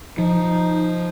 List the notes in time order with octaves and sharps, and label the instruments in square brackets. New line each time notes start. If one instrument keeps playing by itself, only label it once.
[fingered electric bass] F3 [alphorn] D#4